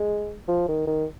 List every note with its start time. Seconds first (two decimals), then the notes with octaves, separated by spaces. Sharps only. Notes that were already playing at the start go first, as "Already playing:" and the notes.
Already playing: G#3
0.48 F3
0.68 D#3
0.87 D#3